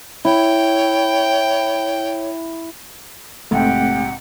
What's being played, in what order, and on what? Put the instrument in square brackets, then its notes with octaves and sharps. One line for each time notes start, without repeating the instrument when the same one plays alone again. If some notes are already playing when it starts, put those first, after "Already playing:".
[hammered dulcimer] E4 [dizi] C#5 [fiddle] G5
[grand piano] A#1 G#2 C3 [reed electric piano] A3 C4 [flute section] G4 F#5